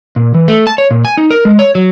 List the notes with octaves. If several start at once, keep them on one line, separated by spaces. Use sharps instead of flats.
A#2
E3
A3
A5
C#5
A#2
G#5
D#4
A#4
G#3
C#5
F#3